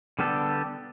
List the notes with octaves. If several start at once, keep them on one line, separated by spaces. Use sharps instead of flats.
D3 G3 B3 G4 A4